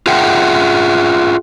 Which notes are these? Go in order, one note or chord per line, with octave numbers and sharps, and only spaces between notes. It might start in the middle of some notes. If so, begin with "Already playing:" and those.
F4 G#4 E5 F#5 G5